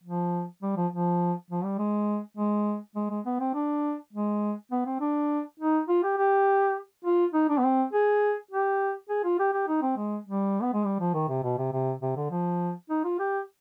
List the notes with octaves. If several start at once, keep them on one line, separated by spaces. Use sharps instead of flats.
F3
G3
F3
F3
F3
G3
G#3
G#3
G#3
G#3
B3
C4
D4
G#3
B3
C4
D4
D#4
F4
G4
G4
F4
D#4
D4
B3
C4
G#4
G4
G#4
F4
G4
G4
D#4
C4
G#3
G3
B3
G#3
G3
F3
D#3
C3
B2
C3
C3
C3
D3
F3
D#4
F4
G4